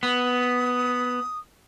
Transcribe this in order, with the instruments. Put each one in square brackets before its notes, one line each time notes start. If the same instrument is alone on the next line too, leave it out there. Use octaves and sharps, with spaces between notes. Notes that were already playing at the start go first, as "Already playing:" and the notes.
[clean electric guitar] B3 [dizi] D#6